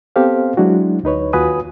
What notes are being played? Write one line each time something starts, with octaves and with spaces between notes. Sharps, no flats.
B3 C4 G4 A4 C5 F5
F#3 G#3 D4 E4 F#4
D2 D#4 B4 C#5
D#2 F4 F#4 B4 G#5 D#6